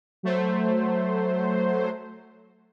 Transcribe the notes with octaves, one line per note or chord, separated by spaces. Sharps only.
F#3 A3 C5